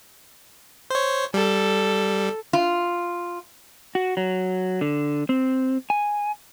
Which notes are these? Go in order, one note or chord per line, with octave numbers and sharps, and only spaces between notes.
C5 C#5
G3 A4
F4
F#4
F#3
D3
C4
G#5